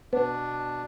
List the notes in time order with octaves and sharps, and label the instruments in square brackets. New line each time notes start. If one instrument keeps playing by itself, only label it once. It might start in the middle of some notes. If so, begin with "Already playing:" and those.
[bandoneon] B2 D4 [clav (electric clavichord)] B3